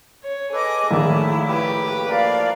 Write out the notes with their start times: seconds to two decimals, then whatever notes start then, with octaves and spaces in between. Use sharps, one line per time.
0.24 C#5
0.53 G#4 A4 B4 D#5 D6
0.91 A#1 A2 D#3 E4 A5
1.48 G4 B4 D6
2.08 F3 A#3 A#4 D5 F5